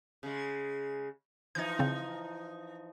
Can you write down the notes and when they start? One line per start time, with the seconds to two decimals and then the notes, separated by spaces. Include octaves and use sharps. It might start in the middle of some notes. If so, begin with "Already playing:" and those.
0.23 C#3 G#3
1.55 E3 F3 D#4 G6 G#6
1.79 C#3 C4